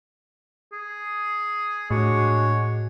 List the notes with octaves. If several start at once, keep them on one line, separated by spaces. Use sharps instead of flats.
G#4
A2 G#3 D4 F#4 C#5